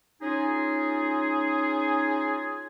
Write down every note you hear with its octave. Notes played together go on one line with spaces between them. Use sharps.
C#4 D#4 F4 G#4